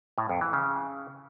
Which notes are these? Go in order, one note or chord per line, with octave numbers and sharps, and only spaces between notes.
A2
F2
E3
C#3